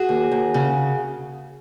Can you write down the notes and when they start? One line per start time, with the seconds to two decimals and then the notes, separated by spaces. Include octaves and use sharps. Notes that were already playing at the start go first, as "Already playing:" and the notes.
Already playing: F#4 G#4
0.09 D#2
0.31 D#2
0.54 C#3